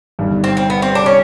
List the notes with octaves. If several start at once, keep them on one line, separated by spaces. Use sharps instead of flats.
G1 G2 D#3
C4
C4
B3
C4
D4
C#4